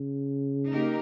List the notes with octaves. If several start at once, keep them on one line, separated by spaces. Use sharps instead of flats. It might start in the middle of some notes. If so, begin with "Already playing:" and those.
Already playing: C#3
A#3 D#4 G4 A#4